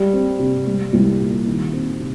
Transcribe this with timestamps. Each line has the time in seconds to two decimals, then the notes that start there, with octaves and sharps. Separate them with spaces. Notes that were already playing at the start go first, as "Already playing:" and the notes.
Already playing: G3
0.13 C4
0.39 C3
0.67 G3
0.93 C2
1.20 A#2
1.47 D#3
1.73 C4
2.00 C3